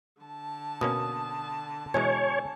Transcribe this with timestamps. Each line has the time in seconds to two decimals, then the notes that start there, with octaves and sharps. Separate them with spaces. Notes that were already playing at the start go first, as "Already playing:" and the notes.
0.22 D3 A5
0.81 B2 A#3 C#4 D#6
1.94 B2 E3 G#3 C#5 G#5